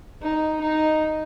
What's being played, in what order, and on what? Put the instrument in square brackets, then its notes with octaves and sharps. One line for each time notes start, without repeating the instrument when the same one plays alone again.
[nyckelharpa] D#4
D#4